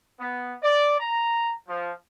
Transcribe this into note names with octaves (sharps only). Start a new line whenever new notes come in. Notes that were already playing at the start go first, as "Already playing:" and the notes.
B3
D5
A#5
F3